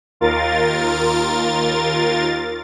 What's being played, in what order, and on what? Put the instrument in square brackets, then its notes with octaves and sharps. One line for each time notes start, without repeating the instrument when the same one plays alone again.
[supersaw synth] D#2 F4 A#4 A6